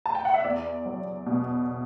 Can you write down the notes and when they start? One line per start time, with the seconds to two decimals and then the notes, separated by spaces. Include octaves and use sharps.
0.06 A5
0.15 G5
0.25 F#5
0.34 E5
0.44 E2 D5
0.85 F#3
1.26 B2